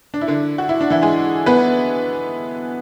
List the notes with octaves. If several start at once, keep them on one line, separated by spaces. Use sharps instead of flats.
D4
E4
D3 D4
F#4
E4
D4
E3 E4
G#3 G#4
B3 B4